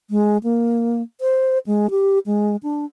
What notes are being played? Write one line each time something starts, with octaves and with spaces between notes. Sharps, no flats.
G#3
A#3
C5
G#3
G4
G#3
D4